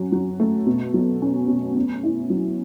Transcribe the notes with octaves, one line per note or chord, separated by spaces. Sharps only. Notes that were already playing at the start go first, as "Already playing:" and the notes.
Already playing: F#3 C#4
F#3
A3
B2
F#3
C#4
B2
C#4
E4
F#3